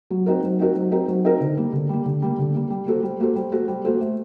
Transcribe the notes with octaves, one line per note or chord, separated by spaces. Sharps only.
F#3
C4 D#4 F#4 A#4
F#3
C4 D#4 F#4 A#4
F#3
C4 D#4 F#4 A#4
F#3
C4 D#4 F#4 A#4
D3
G3 A#3
D3
G3 A#3
D3
G3 A#3
D3
G3 A#3
G3
A#3 F#4 A4 C5
G3
A#3 F#4 A4 C5
G3
A#3 F#4 A4 C5
G3
A#3 F#4 A4 C5
A3